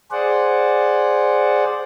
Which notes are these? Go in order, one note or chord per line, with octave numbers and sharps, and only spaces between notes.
G#4 C5 D5 F#5